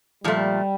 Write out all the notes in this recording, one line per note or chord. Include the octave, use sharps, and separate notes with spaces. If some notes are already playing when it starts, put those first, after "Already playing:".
A#2 F3 G3 A3